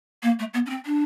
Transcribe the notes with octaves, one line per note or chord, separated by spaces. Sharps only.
A#3
A3
B3
C#4
C4
D4